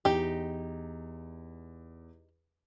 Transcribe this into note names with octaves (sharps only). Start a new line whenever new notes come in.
E2 D#4 G4